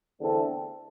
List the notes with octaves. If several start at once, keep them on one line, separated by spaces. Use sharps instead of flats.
E2 D3 A3 C4 A4